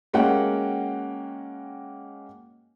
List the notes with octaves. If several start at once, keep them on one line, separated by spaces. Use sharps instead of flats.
G#3 A#3 C#4 F#4 F#5 G5